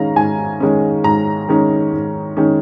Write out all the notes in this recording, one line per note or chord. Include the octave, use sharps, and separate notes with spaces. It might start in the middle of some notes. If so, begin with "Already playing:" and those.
Already playing: D#3 G#3 C#4 F5 A#5
G#2 G#5
D#3 G#3 C#4
G#2 A#5
D#3 G#3 C#4
G#2
D#3 G#3 C#4